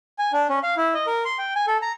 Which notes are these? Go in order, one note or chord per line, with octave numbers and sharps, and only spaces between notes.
G#5
D4
C#4
F5
E4
D#5
A#4
C6
G5
G#5
A4
A#5